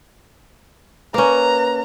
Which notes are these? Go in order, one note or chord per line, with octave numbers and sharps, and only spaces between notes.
A#3 C#4 B4 A#5